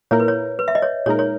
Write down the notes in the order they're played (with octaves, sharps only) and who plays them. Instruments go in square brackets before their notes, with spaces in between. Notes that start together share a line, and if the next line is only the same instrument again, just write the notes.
[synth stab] A#2 A#3 E4 A#4 [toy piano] C#5
[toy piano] B4
C#5
B4
E5
D#5
C#5
[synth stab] A#2 G#3 D#4 A#4 [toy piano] C#5
[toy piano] C#5